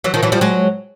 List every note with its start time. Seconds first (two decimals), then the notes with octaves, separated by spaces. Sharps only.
0.04 E3 F#3
0.14 D#3 F3
0.23 E3 F#3
0.32 F3 G3
0.41 F#3 G#3